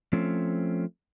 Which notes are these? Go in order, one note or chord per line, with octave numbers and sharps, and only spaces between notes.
F3 A3 C4 C#4